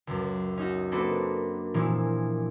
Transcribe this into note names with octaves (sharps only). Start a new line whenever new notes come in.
C#2 F#2
C#4 D#4 F#4
A#3 C4 D4 F#4 A4 B4
A#2 E3 F3 C4 E4